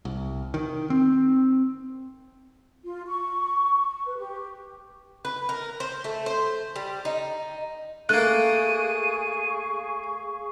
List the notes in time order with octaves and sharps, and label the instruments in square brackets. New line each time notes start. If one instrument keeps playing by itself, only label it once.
[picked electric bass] C2
D#3
C4
[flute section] F4
C#6
C#6
B4
G4
[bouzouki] B4
A#4
C5
A3
C5
G3
D#4
[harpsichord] A3 A#3 [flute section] G#4 F5 C#6 [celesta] F#6 [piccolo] D#7